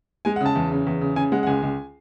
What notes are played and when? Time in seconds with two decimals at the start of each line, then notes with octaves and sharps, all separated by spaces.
0.25 G#3 G#5
0.36 F#5
0.41 C#3 A5
0.56 E2
0.72 C#3
0.87 E2
1.01 C#3
1.16 C#3 G#5
1.32 G#3 F#5
1.43 F#5
1.47 C#2 G#5
1.62 C#2